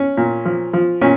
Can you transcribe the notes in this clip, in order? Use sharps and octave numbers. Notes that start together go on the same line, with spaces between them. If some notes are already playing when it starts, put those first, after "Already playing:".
Already playing: C#4
A#2
F3
F3
A#2 C#4